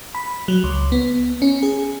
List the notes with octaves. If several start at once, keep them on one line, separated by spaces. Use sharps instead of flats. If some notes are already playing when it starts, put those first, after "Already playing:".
B5
F#3
C#2
B3
C#4
G#4